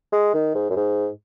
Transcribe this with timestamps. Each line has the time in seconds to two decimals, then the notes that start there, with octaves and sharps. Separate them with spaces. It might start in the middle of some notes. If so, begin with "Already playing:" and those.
0.12 G#3
0.34 D#3
0.55 G#2
0.70 F#2
0.76 G#2